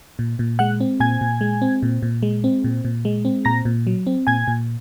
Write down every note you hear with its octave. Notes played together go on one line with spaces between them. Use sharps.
A#2
A#2
G#3 F#5 F#6
C4
A#2 G#5 G#6
A#2
G#3
C4
A#2
A#2
G#3
C4
A#2
A#2
G#3
C4
A#2 A#5 A#6
A#2
F#3
C4
A#2 G#5 G#6
A#2